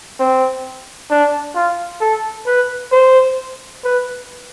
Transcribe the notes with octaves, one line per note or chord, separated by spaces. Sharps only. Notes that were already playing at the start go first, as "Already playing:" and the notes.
C4
D4
F4
A4
B4
C5
B4